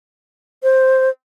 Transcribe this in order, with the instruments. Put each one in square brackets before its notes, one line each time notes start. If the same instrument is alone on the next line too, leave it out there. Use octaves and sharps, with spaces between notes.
[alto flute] C5